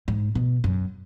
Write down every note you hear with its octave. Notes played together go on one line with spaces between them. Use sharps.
G#2
B2
F#2